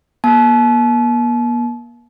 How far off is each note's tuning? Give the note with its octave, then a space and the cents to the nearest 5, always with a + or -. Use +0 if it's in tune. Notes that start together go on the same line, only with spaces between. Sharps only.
A#3 +45 A5 -35